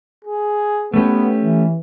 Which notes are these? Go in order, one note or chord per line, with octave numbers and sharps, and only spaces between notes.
G#4
A3 B3 C#4 G4
E3